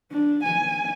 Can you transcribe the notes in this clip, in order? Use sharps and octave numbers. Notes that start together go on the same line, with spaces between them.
D4
G#5